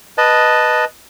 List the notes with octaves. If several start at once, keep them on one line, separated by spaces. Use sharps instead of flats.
B4 D#5 A5